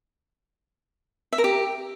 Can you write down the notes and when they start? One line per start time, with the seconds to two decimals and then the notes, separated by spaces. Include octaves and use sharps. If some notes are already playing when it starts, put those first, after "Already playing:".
1.32 E5
1.38 A#4
1.44 G4